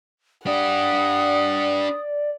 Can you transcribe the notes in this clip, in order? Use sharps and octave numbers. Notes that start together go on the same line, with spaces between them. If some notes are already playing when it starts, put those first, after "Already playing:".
D4 G4 D5 F#5 D#6